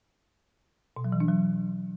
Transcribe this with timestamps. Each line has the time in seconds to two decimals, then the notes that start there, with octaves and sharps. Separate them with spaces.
0.96 B2
1.04 F#3
1.12 E3
1.20 D4
1.28 F#3